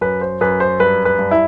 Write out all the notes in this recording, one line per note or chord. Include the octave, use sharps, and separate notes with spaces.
F#2 B4
C5
F#2 B4
C5
G2 B4
B4
G2
E4